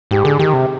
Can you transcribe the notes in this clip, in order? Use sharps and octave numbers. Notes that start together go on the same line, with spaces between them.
G#2 G4
D3 G#4
D#3 G4
C3